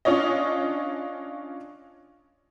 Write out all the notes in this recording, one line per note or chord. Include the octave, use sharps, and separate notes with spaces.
C#4 D4 F4 C#5 D#5